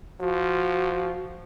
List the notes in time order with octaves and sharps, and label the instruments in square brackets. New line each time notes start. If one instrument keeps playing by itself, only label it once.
[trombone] F3 [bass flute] F#4